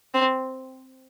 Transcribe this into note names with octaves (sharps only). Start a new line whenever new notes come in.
C4